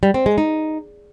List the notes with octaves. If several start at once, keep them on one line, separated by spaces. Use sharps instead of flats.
G3
C4
G#3
D#4